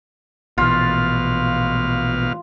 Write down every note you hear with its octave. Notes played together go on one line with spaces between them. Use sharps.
A#1 B2 E3 F4 F5